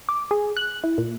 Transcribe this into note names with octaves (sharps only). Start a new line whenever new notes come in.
D6
G#4
F#6
E4
A#2